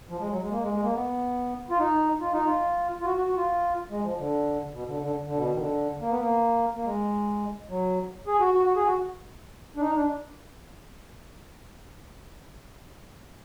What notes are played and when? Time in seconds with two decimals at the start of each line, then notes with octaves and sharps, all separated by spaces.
0.10 F3
0.20 G#3
0.30 F#3
0.42 G#3
0.52 A#3
0.62 G#3
0.74 G#3
0.83 A#3
0.94 B3
1.70 F4
1.79 D#4
2.21 F4
2.33 D#4
2.46 F4
3.01 F4
3.06 F#4
3.17 F#4
3.27 F#4
3.37 F4
3.90 G#3
4.04 F3
4.19 D3
4.74 B2
4.89 D3
5.02 D3
5.27 D3
5.38 B2
5.54 D#3
5.58 D3
6.01 A#3
6.11 B3
6.20 A#3
6.77 A#3
6.86 G#3
7.70 F#3
8.27 G#4
8.40 F#4
8.54 F#4
8.65 F#4
8.76 G#4
8.87 F#4
9.77 D4
9.81 D#4
9.96 D4